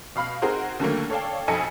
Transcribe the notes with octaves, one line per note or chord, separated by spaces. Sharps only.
B2 F5 B5 F6
C4 D#4 F#4 G#4 A#4 C5
D#2 D3 F#3 A3 A#3
A4 C#5 D5 F5 G5 A5
B1 F2 A4 D#5 G#5 C#7